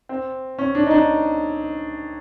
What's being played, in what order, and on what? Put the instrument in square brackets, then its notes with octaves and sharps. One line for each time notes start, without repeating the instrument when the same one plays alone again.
[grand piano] C4
C#4
D4
D#4
D4